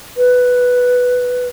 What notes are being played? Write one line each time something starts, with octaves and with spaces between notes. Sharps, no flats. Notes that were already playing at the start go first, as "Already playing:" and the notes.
B4